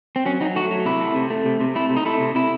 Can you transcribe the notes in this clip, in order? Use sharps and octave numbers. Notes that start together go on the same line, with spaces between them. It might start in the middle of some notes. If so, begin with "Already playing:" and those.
C4
F#3 C#4
F#3 D#4
A3 F#4
F#3
C3 E4
A3
C3
A3
C3
C3
A3 E4
C3
D#4
A3 E4
C3
C3 E4